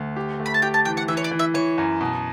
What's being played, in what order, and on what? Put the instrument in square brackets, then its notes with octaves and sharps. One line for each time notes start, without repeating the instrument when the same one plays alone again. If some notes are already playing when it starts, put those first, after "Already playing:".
Already playing: [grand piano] D2
G4
A3
[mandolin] B5
A5
[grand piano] G4 [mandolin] G5
[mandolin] A5
[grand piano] E3 [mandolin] G5
[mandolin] F#5
[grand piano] E3 [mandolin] E5
[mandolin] C#5
D5
[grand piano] E3
[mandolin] E5
[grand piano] E3 [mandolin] C#5
[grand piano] F#2
B2